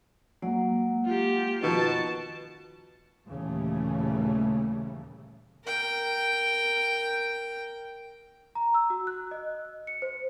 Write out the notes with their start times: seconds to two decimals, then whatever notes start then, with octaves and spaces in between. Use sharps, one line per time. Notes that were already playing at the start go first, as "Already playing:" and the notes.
0.42 F#3 G#3 A#3 F#5
1.05 F4 G4
1.63 B2 D#3 F3 A5
3.27 D#2 A#2 C#3 E3 G3 A3
5.64 A#4 G5
8.55 A#5
8.74 E6
8.90 F#4
9.07 F#6
9.31 D#5
9.87 C#7
10.02 C5